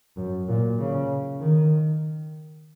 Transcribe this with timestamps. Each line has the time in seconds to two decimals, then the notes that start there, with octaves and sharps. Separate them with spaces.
0.17 F#2
0.49 A#2
0.79 C#3
1.41 D#3